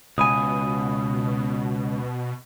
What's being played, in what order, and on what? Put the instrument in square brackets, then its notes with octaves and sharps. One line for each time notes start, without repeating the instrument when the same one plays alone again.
[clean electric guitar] C#2 G#5 [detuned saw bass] B2 [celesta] B5 D#6